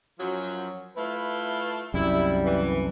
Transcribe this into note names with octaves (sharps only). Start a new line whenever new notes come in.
F#2 F3 F#3
A3 E4 F4 B4
C2 F#2 G3 E4
E3